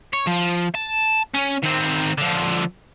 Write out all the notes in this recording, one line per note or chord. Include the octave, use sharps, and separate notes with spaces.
C#5
F3
A5
C#4
D#3 C4
D3 F3